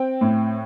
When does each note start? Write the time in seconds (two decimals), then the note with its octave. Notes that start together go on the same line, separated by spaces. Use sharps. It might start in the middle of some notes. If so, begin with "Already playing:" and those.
Already playing: C4 G5
0.21 A2